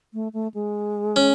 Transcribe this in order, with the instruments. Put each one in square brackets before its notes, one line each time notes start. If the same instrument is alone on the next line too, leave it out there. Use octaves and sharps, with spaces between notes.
[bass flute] A3
A3
G#3
[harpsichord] C#4